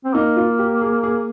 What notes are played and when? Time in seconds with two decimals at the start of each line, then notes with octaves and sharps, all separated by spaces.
0.04 C4
0.14 A#3 D#4
0.37 F4
0.59 G4
0.82 G#4
1.03 G#4